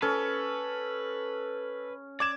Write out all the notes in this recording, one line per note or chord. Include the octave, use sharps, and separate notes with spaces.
C#4 A4 B4
D5 D6 G#6 E7